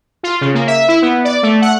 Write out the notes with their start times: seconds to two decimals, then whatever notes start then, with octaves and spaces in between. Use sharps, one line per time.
0.23 F4
0.41 C#3
0.54 A#3
0.67 E5
0.88 E4
1.02 B3
1.25 D5
1.43 A3
1.62 F#5